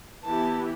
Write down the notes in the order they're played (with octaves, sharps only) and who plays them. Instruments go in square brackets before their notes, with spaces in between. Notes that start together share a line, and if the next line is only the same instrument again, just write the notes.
[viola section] E3 B3 E4 G4 [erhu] A5